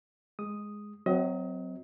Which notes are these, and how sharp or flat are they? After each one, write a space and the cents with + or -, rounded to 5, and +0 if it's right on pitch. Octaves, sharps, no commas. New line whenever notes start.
G#3 +0 D#6 +0
F#3 +0 C4 -25 D#5 +35